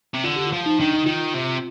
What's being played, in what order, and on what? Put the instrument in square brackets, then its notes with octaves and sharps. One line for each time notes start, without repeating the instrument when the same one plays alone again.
[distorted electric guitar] C3
[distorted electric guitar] D3 [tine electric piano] F4
[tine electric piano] G4
F4
[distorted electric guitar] F3
[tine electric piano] D#4
[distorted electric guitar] D#3 [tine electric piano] D4
[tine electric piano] D#4
[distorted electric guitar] D#3 [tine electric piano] F4
[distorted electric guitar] C3